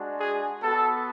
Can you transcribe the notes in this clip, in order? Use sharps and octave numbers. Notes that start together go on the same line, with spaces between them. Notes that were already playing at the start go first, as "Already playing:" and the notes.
Already playing: G#3 D4 F#4
G#4
B3 F#4 A4